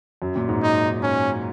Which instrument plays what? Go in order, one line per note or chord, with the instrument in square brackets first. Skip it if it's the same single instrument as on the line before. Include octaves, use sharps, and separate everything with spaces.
[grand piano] F#2
A#2
G#2
[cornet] D#4
C#4